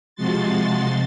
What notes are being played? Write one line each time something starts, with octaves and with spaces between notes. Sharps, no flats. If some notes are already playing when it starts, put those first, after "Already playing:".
C3 F3 G#3 F#4 C6 A6